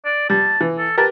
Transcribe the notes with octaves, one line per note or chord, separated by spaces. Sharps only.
D5
G3 A5
E3
A4
G4 A#4 B4 A5